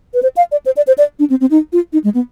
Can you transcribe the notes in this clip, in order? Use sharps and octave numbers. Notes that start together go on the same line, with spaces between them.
B4
C5
F5
D5
C5
D5
C5
D5
D4
C4
C4
D#4
F4
D#4
G#3
B3